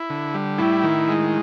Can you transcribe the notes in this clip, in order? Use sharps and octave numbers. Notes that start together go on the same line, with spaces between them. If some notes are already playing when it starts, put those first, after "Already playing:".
Already playing: E4
D3
G3
A2 E4
D#3
G#3